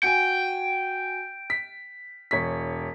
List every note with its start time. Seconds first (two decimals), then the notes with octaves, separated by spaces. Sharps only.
0.03 F#4 G5 G#5
1.50 B6
2.31 E1 C#5 B6